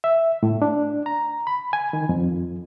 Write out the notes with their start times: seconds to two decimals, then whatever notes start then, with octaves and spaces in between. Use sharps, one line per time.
0.04 E5
0.43 A2
0.62 D4
1.06 A#5
1.47 B5
1.73 G#5
1.93 D#3
2.09 F2